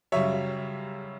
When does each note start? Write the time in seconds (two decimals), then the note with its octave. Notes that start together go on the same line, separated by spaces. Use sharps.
0.12 F#2 C#3 G3 C#5 E5